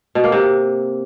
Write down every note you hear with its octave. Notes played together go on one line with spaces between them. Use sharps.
B2
A#3
C3